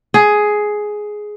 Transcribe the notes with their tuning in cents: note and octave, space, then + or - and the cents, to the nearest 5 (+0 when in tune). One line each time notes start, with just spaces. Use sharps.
G#4 +10